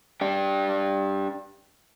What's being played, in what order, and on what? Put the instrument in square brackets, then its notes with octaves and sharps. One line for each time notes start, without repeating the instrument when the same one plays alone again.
[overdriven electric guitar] D4 G4